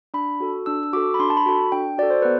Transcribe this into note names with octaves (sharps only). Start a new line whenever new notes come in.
D4 B5
F#4 A4
D4 E6
E6
F#4 A4 D6
B5
D4 C6
A5
B5
F#4 A4
D4 G5
F#4 A4 D5
C5
B3 B4